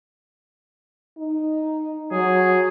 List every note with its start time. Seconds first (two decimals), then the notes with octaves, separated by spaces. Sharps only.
1.18 D#4
2.12 F#3 G#4